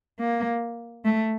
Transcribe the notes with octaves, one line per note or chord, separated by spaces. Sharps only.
A#3
A3